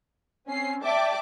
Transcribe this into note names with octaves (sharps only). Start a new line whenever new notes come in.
C4 C#4 C7
D5 E5 G5 A5 D6